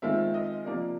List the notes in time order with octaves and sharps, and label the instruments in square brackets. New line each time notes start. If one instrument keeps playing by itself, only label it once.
[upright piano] D#3 G#3 C4 F4 E5
D#5
C3 F3 A#3 D4